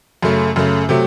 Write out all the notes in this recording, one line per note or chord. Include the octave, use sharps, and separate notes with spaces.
F#2 C#3 A3
F#2 C#3 A3
C3 F#3 A3